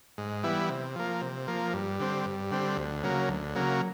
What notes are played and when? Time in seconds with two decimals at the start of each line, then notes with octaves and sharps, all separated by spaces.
0.18 G#2
0.43 E3 G3 B3 E4
0.69 C3
0.96 F3 A#3
1.21 C3
1.47 F3 A#3
1.73 G2
2.00 D3 G3 C4
2.25 G2
2.51 D3 G3 C4
2.77 D2
3.03 C#3 F#3 A#3
3.29 D2
3.55 C#3 F#3 A#3